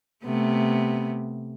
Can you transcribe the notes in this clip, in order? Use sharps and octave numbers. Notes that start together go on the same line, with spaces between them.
C3 A3 B3